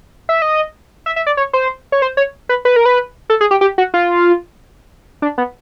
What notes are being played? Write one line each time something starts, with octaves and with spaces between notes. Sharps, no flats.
E5
D#5
E5
E5
D5
C#5
C5
C#5
C5
C#5
B4
B4
A#4
B4
A4
G#4
G4
G4
F#4
F4
D4
B3